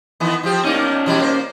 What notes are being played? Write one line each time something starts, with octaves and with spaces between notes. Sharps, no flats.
D#3 E3 B3
F3 C4 G4
A#3 C#4 D#4 D5
B2 E3 G3
A#3 C5